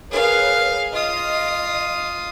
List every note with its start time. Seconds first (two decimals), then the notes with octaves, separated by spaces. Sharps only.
0.10 G#4 A#4 B4 C#5 F5
0.93 F4 D#5 D#6